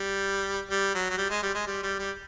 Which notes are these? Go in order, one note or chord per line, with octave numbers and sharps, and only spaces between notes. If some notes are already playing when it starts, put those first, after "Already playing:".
Already playing: G3
G3
F#3
F#3
G3
G#3
G3
G#3
G3
G3
G3